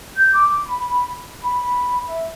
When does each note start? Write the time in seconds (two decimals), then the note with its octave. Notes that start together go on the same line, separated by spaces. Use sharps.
0.17 G6
0.34 D6
0.66 B5
1.44 B5
2.07 E5